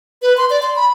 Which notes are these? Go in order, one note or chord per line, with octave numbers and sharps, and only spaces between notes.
B4
C6
D5
C6
B5